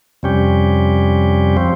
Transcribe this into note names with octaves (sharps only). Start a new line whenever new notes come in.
F2 C3 G3 C#4 G4
F3 C4